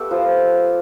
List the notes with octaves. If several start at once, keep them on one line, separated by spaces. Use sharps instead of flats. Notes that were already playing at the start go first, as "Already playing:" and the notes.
Already playing: A3 B3 G4 A4 B4
F3 F4